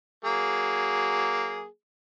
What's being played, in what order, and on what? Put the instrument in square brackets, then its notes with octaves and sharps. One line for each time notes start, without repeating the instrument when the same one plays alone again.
[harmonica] F#3 A#3 G#4